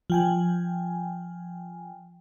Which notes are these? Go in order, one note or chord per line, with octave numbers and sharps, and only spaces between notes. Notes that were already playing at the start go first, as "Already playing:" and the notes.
F3 G5 G#5